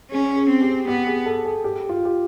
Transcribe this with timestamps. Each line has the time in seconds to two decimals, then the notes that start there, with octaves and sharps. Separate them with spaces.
0.11 C#4 G#4
0.36 G#4
0.50 C4
0.62 G4
0.88 B3 G4
1.07 G#4
1.26 A4
1.45 G#4
1.64 G4
1.89 F4
2.05 G4